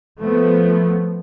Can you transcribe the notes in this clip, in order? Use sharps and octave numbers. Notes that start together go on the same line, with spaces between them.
F3 A3 B3